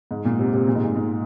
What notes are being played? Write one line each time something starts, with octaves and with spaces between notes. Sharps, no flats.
G#2
A#2
C3
C3
A#2
G#2
A#2
G#2